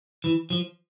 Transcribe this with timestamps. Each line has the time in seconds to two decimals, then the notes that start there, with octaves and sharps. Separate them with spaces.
0.24 E3
0.50 F3